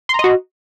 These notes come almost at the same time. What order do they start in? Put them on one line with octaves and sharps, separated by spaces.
C6 A#5 D#5 F#4